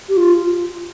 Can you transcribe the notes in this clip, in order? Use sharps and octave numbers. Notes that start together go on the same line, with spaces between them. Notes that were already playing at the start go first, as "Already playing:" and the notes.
G4
F4